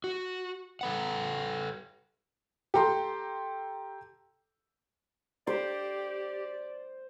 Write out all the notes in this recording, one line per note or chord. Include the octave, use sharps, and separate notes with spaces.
F#4
A4 B4 F#5
G4 A4 A#5 C6
G4 C5 D5